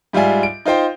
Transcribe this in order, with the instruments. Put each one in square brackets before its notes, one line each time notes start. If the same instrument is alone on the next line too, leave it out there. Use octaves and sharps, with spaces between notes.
[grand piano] G#2 G3 F4 E5 G#5
D7
D#4 F4 C5 G5